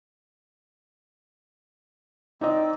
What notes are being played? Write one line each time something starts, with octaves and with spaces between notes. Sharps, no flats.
C4 D#4 D5 D#5